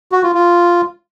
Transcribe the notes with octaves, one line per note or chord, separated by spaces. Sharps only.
F#4
F4
F4